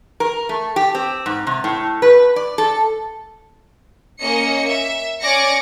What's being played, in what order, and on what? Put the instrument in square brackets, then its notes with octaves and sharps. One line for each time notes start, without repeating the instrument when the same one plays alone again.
[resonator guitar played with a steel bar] A#4
A3
G4
C4
G#2
C3
A2
B4
D5
A4
[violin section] A#3 C#4 D#5 C#7
E5
C#4 D5 D6 G#6 A#6 C#7